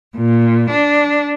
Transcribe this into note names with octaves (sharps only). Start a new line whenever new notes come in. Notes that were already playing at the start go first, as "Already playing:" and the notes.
A#2
D4